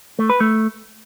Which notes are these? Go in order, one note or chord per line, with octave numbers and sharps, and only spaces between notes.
A3
B4
A3